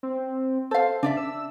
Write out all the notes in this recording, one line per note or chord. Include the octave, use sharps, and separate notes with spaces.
C4
A4 C5 F5
C#3 D4 D5 E5
E6